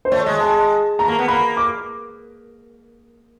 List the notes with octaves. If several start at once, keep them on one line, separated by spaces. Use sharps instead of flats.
C5
A3 C#5
G#3 D#5
A5
A3 A#5
A#3
B3
A#3 B5
D6